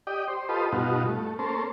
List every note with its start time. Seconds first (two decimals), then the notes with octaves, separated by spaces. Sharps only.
0.07 G4 D5 D#5 G5
0.28 C5
0.49 F4 G4 A4 B4 C5 D#5
0.72 G2 B2 D#4 F4 F#4
1.07 A3
1.39 A#3 C#4 A4 C5